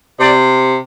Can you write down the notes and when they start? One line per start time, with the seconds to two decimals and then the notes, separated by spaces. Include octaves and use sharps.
0.19 C3 D5